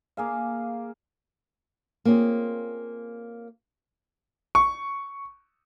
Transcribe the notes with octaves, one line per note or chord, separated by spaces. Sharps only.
A#3 G#4 F5
A#3 C4 C#4 F4 G#4
C#6